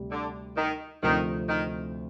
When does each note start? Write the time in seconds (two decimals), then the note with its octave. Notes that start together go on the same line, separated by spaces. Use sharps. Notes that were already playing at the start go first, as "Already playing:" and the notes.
Already playing: D2 C3 G3
0.11 D3
0.57 D#3
1.02 D2 C3 D#3 F3 C4
1.49 D#3